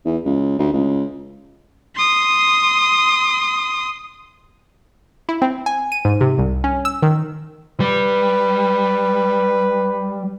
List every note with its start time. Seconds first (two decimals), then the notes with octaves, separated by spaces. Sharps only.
0.05 E2
0.25 C#2
0.59 D2
0.73 C#2
1.96 C6 D#6
5.29 E4
5.42 C4
5.66 G#5
5.92 D#7
6.05 G#2
6.21 C3
6.38 C2
6.64 C#4
6.85 E6
7.02 D#3
7.80 G3 B4